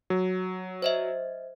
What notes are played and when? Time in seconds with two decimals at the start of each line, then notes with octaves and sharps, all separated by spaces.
0.10 F#3
0.82 C5 D#5 E5